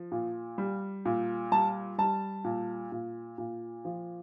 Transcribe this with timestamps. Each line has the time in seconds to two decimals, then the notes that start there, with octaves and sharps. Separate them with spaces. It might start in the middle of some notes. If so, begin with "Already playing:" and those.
Already playing: F3
0.12 A#2
0.58 G3
1.05 A#2
1.52 G3 A5
1.98 G3 A5
2.45 A#2
2.92 A#2
3.38 A#2
3.85 F3